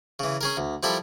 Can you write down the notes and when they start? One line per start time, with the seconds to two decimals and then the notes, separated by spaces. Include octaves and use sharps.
0.19 C#3 E3
0.41 C#4 G#4 A#4
0.57 D2
0.83 F3 G3 E4 A4 A#4